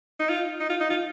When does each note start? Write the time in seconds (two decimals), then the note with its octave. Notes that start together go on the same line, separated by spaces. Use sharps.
0.20 D#4
0.29 F4
0.60 D#4
0.70 F4
0.81 D#4
0.90 F4